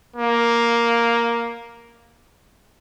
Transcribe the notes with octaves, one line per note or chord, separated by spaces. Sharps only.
A#3